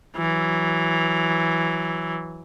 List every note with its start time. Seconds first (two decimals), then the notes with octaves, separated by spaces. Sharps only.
0.17 E3 F#3